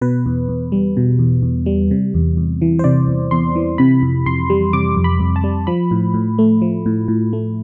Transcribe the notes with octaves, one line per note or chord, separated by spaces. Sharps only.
B2 B4
E2
E2
G3
B2
E2
E2
G3
C3
E2
E2
E3
C5
C3 D5
E2
E2 C6
E3
C3 B5
F2
F2 C6
G3
C3 D6
F2
B5
F2
A5
G3
F3 B5
A2
A2
A3
F3
A2
A2
A3